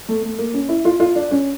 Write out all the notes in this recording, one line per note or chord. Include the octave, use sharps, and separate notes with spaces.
A3
A3
A#3
C#4
E4
F4
F4
D4
C#4